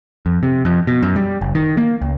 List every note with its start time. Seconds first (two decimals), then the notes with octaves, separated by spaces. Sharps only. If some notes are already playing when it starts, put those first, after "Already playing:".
0.26 F2
0.43 C3
0.65 F2
0.87 B2
1.02 F#2
1.16 G3
1.41 F#1
1.55 D#3
1.77 A#3
2.02 C#2